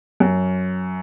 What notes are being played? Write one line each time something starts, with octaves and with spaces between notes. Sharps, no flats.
F#2